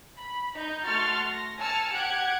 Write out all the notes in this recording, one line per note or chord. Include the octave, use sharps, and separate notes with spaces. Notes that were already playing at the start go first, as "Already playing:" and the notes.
B5
D#4 A#5 G6
A3 F#4 C6 C#6 F6 A6
A#6
G#5 A5 E6 F6 C#7
G4 F#5 F#6 G#6 D7